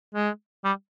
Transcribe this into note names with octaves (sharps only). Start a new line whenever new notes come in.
G#3
G3